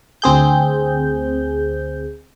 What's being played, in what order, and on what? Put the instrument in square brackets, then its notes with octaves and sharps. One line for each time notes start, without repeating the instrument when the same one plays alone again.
[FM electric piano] D2 C4 G#4 G6